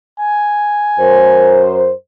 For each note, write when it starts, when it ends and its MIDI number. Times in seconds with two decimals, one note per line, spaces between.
0.19 1.69 80
1.00 1.92 42
1.00 1.92 70
1.00 1.92 72